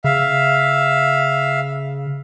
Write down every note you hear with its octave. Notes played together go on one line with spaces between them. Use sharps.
C#3 E5 F5